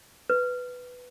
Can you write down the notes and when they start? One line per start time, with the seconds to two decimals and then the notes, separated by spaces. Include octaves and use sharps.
0.30 B4